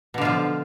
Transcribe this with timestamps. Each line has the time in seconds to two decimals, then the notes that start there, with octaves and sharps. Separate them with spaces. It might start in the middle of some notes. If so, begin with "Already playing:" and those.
0.14 B2
0.18 D3
0.21 F4
0.25 F3